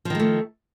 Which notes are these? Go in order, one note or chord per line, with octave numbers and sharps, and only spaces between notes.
D#3 F3 G#3 A3